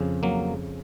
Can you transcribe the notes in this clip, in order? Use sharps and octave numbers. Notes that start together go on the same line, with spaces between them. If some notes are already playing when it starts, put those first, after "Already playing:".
Already playing: F2 C#3
F#3 A#3